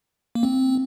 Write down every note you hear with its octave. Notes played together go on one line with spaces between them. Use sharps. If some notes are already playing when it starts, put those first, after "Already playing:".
A#3
C4